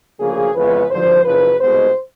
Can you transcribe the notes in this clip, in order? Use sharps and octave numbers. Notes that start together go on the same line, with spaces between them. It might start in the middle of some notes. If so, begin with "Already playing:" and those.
D2 C#3 F3 A#3 G#4
F2 C#3 E3 G#3 B3 B4
G#1 G2 D3 F3 C5
F#1 F#2 C#3 F3 B4
C2 B2 G#3 B3 C5